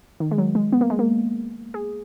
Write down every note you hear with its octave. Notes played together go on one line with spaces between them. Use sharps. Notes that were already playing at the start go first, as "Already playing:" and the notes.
D#3
G#3
F#3
G#3
B3
A#3
G#3
A#3
G#4